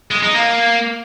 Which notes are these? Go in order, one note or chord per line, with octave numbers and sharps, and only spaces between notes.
G#3
D#4
A#3